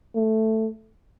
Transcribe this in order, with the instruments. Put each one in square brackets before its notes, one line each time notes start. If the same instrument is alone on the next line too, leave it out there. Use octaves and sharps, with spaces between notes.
[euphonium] A3